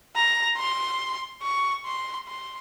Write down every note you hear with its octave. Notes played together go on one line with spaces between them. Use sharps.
A#5
C6
C#6
C6
C6